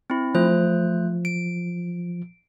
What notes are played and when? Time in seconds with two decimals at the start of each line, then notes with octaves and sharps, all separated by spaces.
0.10 C4 E4
0.35 F3 A3 C5 F#6
1.25 D7